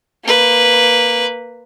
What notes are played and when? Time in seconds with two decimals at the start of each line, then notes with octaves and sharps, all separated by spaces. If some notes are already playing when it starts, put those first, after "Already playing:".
0.24 A#3 B4